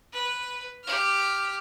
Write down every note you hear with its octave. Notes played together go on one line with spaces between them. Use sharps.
B4
G4 F6